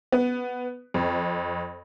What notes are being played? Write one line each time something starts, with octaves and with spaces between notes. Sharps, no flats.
B3
F2